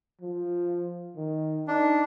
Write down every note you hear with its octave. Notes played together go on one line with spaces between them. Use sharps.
F3
D#3
D4 D#4